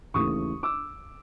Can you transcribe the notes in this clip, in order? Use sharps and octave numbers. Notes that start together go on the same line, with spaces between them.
D#2 C#3 E3 A3 C#6 D#6
D6 E6